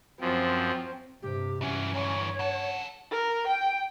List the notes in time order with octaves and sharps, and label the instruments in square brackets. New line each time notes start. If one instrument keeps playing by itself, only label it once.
[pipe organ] F#2 F3 [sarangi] C4
[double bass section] G2 C3 [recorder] G4
[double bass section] G2 [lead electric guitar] E3 F#3 [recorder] C#4
[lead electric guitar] D2 E3 [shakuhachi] C#5
[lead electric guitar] C#3 A4 [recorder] F#5
[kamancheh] A#4
G5